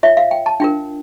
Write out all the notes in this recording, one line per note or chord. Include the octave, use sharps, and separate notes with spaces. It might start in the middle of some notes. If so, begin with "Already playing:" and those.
F4 C#5 E5
F5
G5
A5
D4 F4 A#4 G5